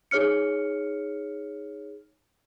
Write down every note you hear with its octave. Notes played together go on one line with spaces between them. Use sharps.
D#4 G#4 C#5 F6 C#7